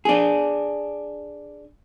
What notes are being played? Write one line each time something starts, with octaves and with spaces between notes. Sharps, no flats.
D4 G#4